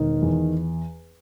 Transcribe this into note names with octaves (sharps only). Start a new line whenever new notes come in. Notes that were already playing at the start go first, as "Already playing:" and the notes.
Already playing: E1 D#3
E2